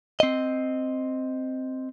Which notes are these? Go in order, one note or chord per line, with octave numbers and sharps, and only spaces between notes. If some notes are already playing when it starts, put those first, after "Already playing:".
C4 D#5